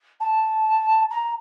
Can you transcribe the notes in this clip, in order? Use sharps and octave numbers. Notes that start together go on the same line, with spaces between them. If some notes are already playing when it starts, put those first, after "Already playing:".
A5
A#5